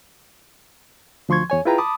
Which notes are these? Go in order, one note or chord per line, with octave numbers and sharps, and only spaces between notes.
D2 F3 C6 C#6 G#6
E2 C#5 G#5
E4 F4 G#4 B4 G5 A#5
A5 B5 D6 D#6